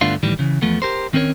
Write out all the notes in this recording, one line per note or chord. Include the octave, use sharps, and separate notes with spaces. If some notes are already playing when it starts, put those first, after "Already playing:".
G2 D3 A3 B3 D4 F4
A2 D#3 E3 G3
C#3 E3
E2 F3 A3 B3
G4 A#4 C5
D#3 C4 C#4 A#4 C#5